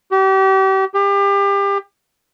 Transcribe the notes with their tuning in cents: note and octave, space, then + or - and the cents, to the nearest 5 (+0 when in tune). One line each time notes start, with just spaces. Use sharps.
G4 -35
G4 +30